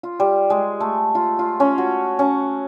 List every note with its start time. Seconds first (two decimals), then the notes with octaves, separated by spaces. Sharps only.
0.03 F4
0.20 G3
0.50 G#3
0.80 A3
1.15 F4
1.39 F4
1.60 C#4
1.78 F#4
2.19 C#4